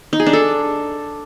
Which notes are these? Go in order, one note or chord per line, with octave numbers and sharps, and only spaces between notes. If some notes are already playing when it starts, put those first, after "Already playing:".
D#4
G#4
D4
A4